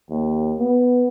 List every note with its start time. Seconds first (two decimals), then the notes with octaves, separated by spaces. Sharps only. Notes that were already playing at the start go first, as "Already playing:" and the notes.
0.10 D#2
0.60 B3